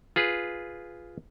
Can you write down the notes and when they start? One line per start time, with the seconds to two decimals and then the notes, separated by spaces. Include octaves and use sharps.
0.16 F4 G#4 B4